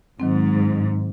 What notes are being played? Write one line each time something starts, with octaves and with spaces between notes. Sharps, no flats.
G#2 D#3 F#3 C4